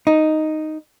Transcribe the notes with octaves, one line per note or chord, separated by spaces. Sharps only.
D#4